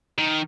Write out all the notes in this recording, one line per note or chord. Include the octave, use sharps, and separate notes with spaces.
D#3